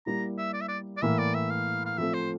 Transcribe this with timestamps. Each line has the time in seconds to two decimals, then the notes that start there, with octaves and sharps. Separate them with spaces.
0.06 G3 A#3 E4 G4 A#5
0.38 E5
0.54 D5
0.61 E5
0.69 D5
0.97 D5
1.02 A2 E3 A#3 E5
1.19 D5
1.34 E5
1.50 F5
1.86 F5
1.98 F3 A3 C4 E5
2.14 C5